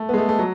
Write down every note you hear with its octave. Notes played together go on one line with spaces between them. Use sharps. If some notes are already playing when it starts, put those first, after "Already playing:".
Already playing: A3
B3
G#3
A3
A3
F#3